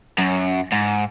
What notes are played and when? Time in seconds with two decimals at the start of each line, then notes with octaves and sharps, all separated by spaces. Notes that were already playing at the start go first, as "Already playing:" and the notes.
0.18 F#2
0.72 G#2